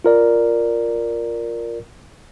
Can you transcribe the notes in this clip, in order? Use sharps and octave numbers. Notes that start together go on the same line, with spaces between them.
F4 A#4 D5